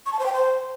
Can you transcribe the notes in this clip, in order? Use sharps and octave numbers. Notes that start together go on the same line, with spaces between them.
C#6
A5
C5
G5
C5